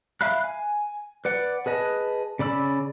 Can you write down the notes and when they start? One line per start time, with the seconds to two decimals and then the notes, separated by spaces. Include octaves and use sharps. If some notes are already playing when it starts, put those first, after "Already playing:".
0.21 E5 F5 B5 F#6
0.44 G#5
1.25 B4 D5 F#5
1.66 G#4 B4 D#5 A5
2.39 C#3 D5 B5 E6